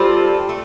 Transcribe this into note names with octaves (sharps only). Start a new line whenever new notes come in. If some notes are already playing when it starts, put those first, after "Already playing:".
Already playing: G3 C4 F4 A4
A3